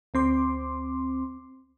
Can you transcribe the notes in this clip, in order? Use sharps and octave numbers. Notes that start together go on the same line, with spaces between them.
D2 C4 C6 D6